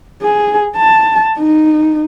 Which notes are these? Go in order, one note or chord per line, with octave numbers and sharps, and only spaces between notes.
G#4
A5
D#4